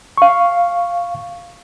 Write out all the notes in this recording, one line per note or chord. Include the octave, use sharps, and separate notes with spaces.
F5 C#6